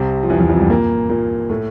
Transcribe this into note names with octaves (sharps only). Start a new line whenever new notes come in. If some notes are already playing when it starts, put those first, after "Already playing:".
Already playing: C2 C3
F3
E2 E3
E2 E3
F2 F3
G2 G3
A#2 A#3
A#2 A#3
A2 A3